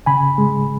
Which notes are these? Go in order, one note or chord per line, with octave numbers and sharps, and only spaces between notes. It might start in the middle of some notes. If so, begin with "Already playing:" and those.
C#3 G#5 B5
G#3